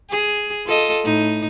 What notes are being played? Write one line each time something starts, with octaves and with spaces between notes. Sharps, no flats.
G#4
F4 A4 D#5
A2 D#4